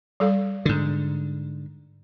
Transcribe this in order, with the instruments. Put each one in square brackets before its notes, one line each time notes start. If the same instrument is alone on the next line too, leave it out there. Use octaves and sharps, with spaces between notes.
[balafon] G3 A4 F5
[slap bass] G#2 D3